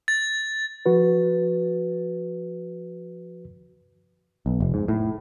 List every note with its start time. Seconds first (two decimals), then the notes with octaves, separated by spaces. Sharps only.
0.08 A6
0.86 F3 F#4 B4
4.46 B1
4.60 F1
4.74 G#2
4.88 A2